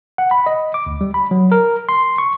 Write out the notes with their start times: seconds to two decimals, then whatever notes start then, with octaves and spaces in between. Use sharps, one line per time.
0.18 F#5
0.31 B5
0.46 D#5
0.74 D6
0.86 D2
1.01 G3
1.14 B5
1.31 F#3
1.52 A#4
1.89 C6
2.18 C#6